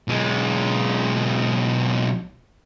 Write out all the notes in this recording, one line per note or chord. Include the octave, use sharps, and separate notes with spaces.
B1 G#3